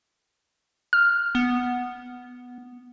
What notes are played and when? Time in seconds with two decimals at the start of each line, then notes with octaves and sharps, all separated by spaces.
0.93 F6
1.35 B3